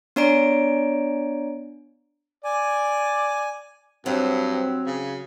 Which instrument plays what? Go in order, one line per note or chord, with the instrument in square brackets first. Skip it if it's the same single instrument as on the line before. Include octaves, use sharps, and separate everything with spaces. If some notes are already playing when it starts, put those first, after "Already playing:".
[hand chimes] B3 D4 C#5 D5 A#5 D7
[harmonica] D5 [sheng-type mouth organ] G#5
[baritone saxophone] G2 [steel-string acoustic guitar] F#3 [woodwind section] C4
[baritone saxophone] C#3